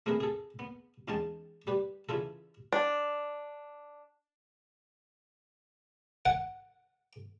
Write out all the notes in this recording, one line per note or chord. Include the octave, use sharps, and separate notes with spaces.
A3 C4 G#4 A#4 B4
G#4 A4
B3
E2 G#3 C#4 D#4 G5 A5
G3 G4 B4
C#3 E3 E4 F4 A4
D4
F#5